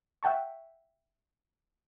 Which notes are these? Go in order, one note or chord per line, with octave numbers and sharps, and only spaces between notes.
E5 F#5 G5 A5 C#6